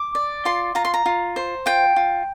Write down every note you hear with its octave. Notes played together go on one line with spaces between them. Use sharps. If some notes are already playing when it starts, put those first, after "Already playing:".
Already playing: D6
D5
F4 C6
F4 A#5
C6
A#5
F4
C5
F4 G5
F4